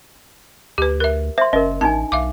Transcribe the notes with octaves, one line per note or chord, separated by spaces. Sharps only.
D2 G4 B4
A#4 E5
C5 E5 C6
F#1 C#4 A#4 D#5
A1 D4 D#4 G#5 A5
B1 E5 F5 D6